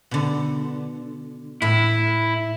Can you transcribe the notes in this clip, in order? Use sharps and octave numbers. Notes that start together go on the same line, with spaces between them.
B2 D3
A2 E4